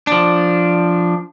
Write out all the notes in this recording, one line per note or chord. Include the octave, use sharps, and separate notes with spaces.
F3 D4